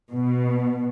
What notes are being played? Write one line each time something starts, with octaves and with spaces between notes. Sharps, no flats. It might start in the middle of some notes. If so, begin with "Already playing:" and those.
B2